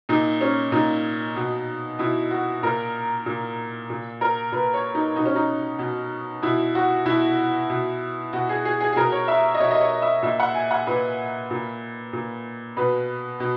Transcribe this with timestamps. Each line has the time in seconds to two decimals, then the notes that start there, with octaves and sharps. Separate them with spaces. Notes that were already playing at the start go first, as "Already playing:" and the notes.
0.09 A#2 D#4
0.41 C#4
0.72 A#2 D#4
1.36 B2
1.99 B2 E4
2.31 F#4
2.63 A#2 A#4
3.26 A#2
3.90 A#2
4.21 A#4
4.52 A#2 B4
4.74 C#5
4.95 D#4
5.16 B2 D#4
5.25 C#4
5.35 D#4
5.79 B2
6.42 B2 E4
6.75 F#4
7.06 B2 E4
7.70 B2
8.33 B2 F#4
8.49 G#4
8.65 G#4
8.80 G#4
8.93 G#4
8.96 B2 A#4
9.12 C#5
9.28 E5
9.54 D#5
9.60 B2 C#5
9.71 D#5
9.81 C#5
10.02 E5
10.22 A#2 E5
10.40 F#5
10.54 G#5
10.71 F#5
10.87 A#2 B4
11.50 A#2
12.13 A#2
12.77 B2 B4
13.40 B2